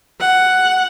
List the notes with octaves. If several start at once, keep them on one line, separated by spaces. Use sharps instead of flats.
F#5